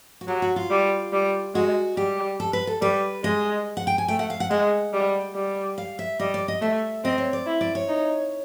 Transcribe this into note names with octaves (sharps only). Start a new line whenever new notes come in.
F#4
F#3 G4
F#4
F4
G3
G3
G#3 F#4
G3 G4
A4
B4
A4
G3 B4
G#3 D#5
F#5
G5
G#5
A3 G5
F#5
F5
F#5
G#3 F#5
G3
G3
F5
E5
G3 D#5
D5
D#5
A3 E5
C4 D#5
C#5
D5
E4
D5
C#5
D#4